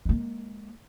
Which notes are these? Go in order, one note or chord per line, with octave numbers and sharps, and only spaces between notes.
G#3 A#3